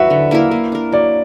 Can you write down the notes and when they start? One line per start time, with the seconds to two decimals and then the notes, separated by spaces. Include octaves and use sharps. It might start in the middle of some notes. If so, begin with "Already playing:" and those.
Already playing: F#3 E4 F#4 B4 E5 F#5
0.10 D3
0.31 A#3 E4 A#4
0.51 A#3
0.72 D4 A#4
0.92 F#3 D5